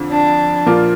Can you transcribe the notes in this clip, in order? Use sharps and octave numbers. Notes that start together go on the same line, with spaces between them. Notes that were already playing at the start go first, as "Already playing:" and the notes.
Already playing: F2 D3 F3
D4
A#2 F3 A#3 D4 F4